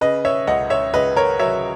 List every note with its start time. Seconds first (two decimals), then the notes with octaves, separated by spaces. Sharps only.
0.01 C#3 B4 D#5
0.25 C#5 E5
0.47 C#2 D#5 F#5
0.70 C#5 E5
0.93 C#2 B4 D#5
1.16 A#4 C#5
1.39 F#3 C#5 E5